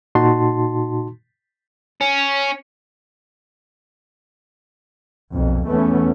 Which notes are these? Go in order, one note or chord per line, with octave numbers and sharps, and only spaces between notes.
A#2 D#4 F#4 A5 C6
C#4
B1 F2 A#2
E2 E3 A3 B3 C#4